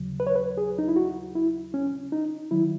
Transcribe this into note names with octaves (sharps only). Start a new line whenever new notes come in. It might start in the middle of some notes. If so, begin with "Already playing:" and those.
Already playing: D#2 C#3 F#3
B4
C#5
B4
G#4
D#4
E4
F#4
E4
C#4
D#4
D#3 F#3 E4